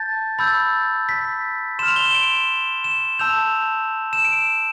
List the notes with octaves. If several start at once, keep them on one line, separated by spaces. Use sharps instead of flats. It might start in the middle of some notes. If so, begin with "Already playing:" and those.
Already playing: A5 G6 A6
B5 E6 G6 A6
B6
C6 F6 E7
F7
G7
E7
D7
E7
A5 E6 G6 F7
E7
D7